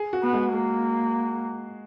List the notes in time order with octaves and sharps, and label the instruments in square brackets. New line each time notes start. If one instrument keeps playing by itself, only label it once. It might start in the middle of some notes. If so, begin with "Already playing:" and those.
Already playing: [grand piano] G#4
F#4
[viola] B3
[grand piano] G#3
[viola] A#3